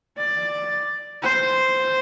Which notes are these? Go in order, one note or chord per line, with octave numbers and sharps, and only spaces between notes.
D5
C5